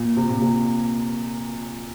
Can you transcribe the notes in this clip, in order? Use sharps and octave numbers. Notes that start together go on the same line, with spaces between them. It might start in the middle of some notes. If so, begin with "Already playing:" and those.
Already playing: A#2
C3
A#2
C3